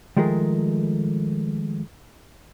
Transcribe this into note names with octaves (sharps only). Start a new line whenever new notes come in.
D#3 F3 G#3 A3 G#4 A#4